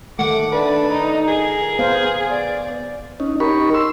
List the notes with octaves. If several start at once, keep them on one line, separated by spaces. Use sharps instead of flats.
D#3 A3 F#5 D6
D4 B4 D5
D#4
G#4 A#4
B3 C5 F5
D5
C#4 D#4
D#4 G4 A#4 B5 C#6
C6 E6